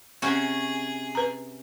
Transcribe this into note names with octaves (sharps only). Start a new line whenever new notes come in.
C3 C#4 F#4 G#4
B4 A#5